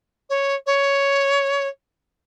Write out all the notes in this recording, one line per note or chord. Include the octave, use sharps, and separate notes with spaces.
C#5
C#5